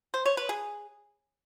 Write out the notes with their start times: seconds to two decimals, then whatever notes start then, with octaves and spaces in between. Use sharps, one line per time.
0.14 C5
0.26 C#5
0.37 B4
0.49 G#4